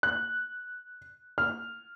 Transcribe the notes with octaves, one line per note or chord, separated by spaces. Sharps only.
F#6
F6